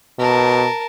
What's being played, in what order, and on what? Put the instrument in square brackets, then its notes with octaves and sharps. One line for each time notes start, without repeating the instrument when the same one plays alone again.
[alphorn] B2 [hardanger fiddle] A#4 A5